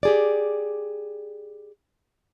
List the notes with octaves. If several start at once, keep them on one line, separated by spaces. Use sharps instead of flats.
G4 G#4 D5